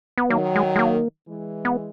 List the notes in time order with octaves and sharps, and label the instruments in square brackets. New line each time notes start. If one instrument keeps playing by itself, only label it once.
[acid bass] B3
[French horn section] D#3 F#3 [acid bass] A#3
[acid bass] G#3
G#3
A#3
[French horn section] E3 G#3
[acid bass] B3